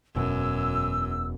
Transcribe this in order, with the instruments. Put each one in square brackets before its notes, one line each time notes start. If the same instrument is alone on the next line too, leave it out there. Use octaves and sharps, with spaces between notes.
[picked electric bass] E1 B2 [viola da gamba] F#2 [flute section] E6